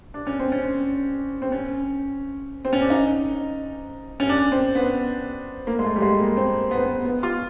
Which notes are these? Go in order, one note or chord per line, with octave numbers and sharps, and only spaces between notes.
D4
C#4
C4
C#4
C4
C#4
C4
C#4
D4
D#4
C#4
D4
C4
B3
A#3
G#3
A3
G3
G#3
A#3
C4
B3
C4
B3
B3
F4